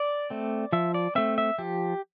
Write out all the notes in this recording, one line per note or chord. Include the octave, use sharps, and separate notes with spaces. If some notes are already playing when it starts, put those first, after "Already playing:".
Already playing: D5
A3 C4
F3 E5
D5
A3 C4 E5
E5
F3 G4